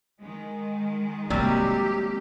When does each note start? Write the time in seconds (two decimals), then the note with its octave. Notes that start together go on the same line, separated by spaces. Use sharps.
0.21 D#3 G#3
1.30 C3 F#3 G3 A#3 C4 G4